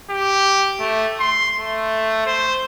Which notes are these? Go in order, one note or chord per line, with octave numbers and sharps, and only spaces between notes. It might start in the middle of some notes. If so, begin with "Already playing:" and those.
G4
A3
C6
A3
C5